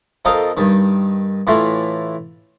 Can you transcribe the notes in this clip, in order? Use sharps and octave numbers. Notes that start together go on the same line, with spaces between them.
F2 A4 A#4 D#5 F5
G2 D#3
A2 E3 A3 F4